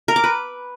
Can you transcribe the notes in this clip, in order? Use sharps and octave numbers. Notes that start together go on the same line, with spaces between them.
A#4
D6
B4